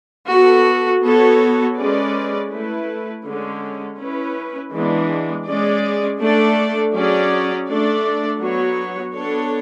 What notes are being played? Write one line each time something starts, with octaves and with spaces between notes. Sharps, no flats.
B3 F#4 A4
B3 F#4 A4 C#5
G#3 C#4 G#4 B4 D5
A3 E4 B4
D3 G#3 C#4
C#4 E4 B4
E3 G#3 B3 D4
G#3 C#4 G#4 D5
A3 D4 A4 D5
F#3 C#4 G#4 D5
A3 D4 A4 D5
F#3 B3 F#4 C#5
B3 D4 A4 C#5